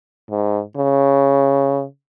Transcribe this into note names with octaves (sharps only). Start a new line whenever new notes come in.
G#2
C#3